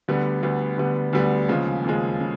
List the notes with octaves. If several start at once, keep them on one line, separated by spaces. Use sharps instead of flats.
D2 D3 G3 B3
D2 D3 G3 B3
D2 D3 G3 B3
D2 D3 G3 B3
D#2 C#3 F3 G#3
D#2 C#3 F3 G#3
C#3